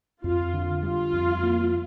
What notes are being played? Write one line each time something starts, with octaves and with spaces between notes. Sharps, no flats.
F2 F4
D3
G3 F4
F2
A#3